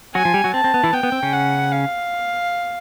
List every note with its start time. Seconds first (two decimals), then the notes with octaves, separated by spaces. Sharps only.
0.14 F#3 F#4 G#5
0.25 F3 F4
0.34 G3 G4
0.44 F#3 F#4
0.53 C4 A5
0.64 C4
0.74 B3
0.84 E3 E4
0.93 B3 G5
1.03 B3
1.12 C4
1.23 C#3 C#4
1.33 F#5
1.72 F5